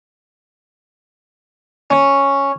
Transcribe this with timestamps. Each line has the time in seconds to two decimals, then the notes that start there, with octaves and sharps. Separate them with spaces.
1.90 C#4